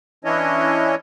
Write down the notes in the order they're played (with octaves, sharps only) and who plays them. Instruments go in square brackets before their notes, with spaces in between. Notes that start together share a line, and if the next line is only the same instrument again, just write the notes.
[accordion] E3 C#4 D4 E4 C#5 D#5